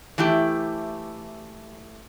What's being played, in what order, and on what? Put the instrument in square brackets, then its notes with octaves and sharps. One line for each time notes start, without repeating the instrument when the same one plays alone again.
[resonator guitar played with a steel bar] E3 A3 E4 G4